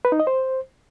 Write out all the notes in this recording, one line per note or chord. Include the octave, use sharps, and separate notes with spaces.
B4
D#4
D#5
C5